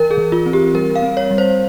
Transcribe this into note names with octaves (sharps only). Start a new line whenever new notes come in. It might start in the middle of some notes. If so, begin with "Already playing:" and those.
Already playing: E3 A#4
G#4
E3
F4
C4
G4
G3 A#4
F5
C4
C#5
G3
C5